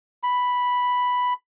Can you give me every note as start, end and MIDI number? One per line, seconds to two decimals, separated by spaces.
0.23 1.33 83